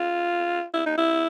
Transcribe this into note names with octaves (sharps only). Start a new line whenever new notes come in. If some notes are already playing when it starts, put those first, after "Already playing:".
Already playing: F4
E4
D#4
E4